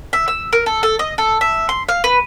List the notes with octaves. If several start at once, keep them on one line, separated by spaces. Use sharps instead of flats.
E5
E6
A#4
A4
A4
D#5
A4
E5
C6
F5
B4